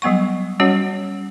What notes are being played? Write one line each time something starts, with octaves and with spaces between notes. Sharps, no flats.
F#3 G3 B3 F#5 C#6
G3 C#4 F#4 C#5 F#5